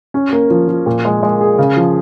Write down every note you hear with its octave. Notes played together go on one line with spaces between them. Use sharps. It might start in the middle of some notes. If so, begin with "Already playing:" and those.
C#4
A#3
F3
F3
A#2
G#3
G#3
G#4
C#3
F3